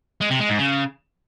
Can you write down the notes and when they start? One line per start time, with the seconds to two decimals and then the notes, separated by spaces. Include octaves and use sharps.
0.21 G#3
0.30 C3
0.40 G#3
0.49 G#2
0.58 C#3